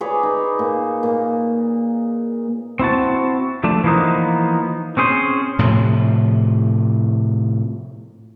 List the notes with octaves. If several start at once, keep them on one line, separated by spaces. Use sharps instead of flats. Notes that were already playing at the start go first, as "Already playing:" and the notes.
G#4 B4 C#5 D5
D#4
A#2
A#2
C4 E4 F#4 A5
F3 A3 D4
E3 F3 G3 A#3 B3 D#4
C4 C#4 G#4 C5
A2 C3 F3